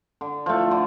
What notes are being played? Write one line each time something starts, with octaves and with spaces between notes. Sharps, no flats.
D3
F3 A3
D3